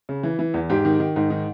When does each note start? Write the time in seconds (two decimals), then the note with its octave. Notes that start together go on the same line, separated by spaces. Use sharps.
0.09 C#3
0.23 E3
0.39 E3
0.54 E2
0.69 G#2 G4
0.85 D#3
1.00 D#3
1.16 G#2
1.30 D#3